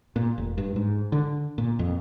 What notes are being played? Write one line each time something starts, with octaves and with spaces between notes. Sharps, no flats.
A#2
F1
G2
G#2
D3
A#2
F2